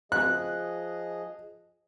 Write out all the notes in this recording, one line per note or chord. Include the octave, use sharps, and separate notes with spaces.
F3 G#4 D#5 F#6